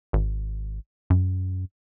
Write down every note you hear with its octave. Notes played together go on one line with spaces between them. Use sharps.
G#1
F#2